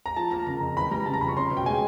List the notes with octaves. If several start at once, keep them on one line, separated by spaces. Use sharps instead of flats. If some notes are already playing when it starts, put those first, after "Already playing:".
A#5
F3 A5
A#3 A#5
C#3 A#5
F2
E3 B5
G3 A#5
C#3 A5
A#5
F2 B5
C#6
C#4 C6
B2
G5
G#3 G#5